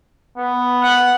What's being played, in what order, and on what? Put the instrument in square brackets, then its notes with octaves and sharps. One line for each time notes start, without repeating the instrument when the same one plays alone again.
[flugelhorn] B3
[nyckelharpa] F#5